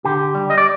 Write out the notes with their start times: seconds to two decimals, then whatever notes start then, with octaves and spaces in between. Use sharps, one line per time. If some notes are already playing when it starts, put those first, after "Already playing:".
0.05 D3 G4
0.35 G3
0.50 D#5
0.58 D5